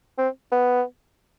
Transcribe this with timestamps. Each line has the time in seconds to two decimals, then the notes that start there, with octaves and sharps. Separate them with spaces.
0.18 C4
0.52 B3